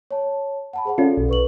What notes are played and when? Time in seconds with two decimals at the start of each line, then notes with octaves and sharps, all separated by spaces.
0.11 C#5 A5
0.73 F#5 A5 B5
0.85 G#4 C5 F#5
0.98 C#4 F4 A4 D5
1.17 B1
1.29 B4 C#6 F#7